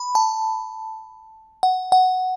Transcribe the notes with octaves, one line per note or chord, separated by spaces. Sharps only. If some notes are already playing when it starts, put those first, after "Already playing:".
Already playing: B5
A5
F#5
F#5